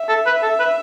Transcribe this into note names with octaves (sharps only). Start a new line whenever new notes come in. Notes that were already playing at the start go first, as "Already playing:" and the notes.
Already playing: E5
A4
B4
A4
B4